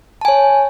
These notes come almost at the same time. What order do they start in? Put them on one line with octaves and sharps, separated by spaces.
A5 G#5 C#5